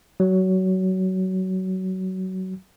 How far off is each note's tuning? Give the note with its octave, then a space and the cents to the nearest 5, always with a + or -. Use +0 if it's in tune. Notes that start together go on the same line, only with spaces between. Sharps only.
F#3 +20